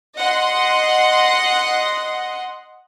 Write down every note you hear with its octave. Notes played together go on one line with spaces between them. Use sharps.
D#5 F#5 C6